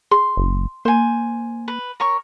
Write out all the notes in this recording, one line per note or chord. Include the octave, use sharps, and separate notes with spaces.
G#4 C6
F#1
A#3 C5 G#5
B4
A#4 C#5 C#6